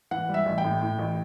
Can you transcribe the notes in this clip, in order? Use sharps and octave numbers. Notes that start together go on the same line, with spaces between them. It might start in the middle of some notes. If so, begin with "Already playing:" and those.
E3 F#5
G3
E5
A1
G5
A2
A2
A1